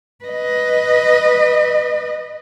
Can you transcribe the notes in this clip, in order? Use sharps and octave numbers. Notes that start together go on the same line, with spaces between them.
B4 D#5